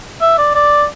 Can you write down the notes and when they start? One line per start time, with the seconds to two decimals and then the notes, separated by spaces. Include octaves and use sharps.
0.21 E5
0.38 D5
0.55 D5